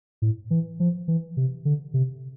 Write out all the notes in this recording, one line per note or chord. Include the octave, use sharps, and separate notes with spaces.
A2
E3
F3
E3
C3
D3
C3